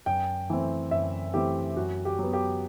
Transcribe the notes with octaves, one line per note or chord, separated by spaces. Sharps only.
F#2 G5
E3 A3 C4
F#2 E5
E3 A3 C4 G4
F#2 F#4
G4
F#3 B3
G4